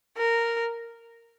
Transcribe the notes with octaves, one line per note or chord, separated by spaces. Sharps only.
A#4